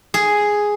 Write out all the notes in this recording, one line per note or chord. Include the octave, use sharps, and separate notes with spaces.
G#4